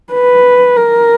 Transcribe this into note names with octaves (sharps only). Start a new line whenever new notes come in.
B4
A#4